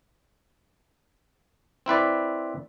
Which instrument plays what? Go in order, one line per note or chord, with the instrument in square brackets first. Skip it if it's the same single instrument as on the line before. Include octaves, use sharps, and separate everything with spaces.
[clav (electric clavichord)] C4 E4 B4 D5